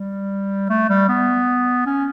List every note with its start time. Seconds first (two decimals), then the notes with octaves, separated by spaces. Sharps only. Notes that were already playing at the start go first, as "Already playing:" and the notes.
Already playing: G3
0.69 A3
0.89 G3
1.08 B3
1.86 C#4